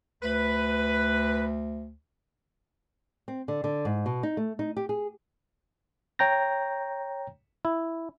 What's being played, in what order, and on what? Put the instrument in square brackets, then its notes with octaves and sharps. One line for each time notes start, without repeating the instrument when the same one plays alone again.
[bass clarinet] D2 [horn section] B4
[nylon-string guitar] C4
D3
D3
G#2
B2
D#4
A3
D#4
G4
G#4
[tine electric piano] C#5 G5 A#5 G6 A#6
[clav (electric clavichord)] E4